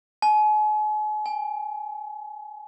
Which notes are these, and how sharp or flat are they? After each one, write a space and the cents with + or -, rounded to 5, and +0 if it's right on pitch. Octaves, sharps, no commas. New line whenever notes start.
G#5 +40
G#5 -30